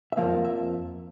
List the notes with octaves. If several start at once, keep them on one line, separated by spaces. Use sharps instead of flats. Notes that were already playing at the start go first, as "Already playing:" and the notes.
E5
F2 C#3 F3 A#3 F5
E5